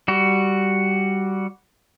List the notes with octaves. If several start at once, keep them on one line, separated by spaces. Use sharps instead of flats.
G3 F#4